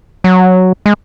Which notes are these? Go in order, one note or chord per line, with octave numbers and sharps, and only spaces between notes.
F#3
G#3